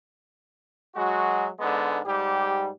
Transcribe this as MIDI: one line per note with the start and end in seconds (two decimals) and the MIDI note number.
0.96 1.46 54
0.96 1.46 56
0.96 1.46 66
1.59 1.99 44
1.59 1.99 50
1.59 1.99 56
1.59 1.99 59
2.05 2.68 44
2.05 2.68 55
2.05 2.68 67